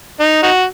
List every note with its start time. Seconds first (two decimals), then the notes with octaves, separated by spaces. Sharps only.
0.20 D#4
0.43 D#4 F#4